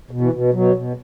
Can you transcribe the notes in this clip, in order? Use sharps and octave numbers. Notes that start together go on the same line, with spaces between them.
B2
E3
B2
B2 F#3
B2